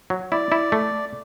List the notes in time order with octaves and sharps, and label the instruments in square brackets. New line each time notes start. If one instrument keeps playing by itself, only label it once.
[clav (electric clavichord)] F#3
[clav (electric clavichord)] E4 [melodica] D5
[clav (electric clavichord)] E4
A3